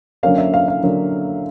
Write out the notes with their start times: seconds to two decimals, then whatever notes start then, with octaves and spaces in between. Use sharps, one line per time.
0.23 D3 F#3 A#3 C#4 F5
0.38 E5
0.54 F5
0.68 F5
0.83 D3 F#3 A#3 C#4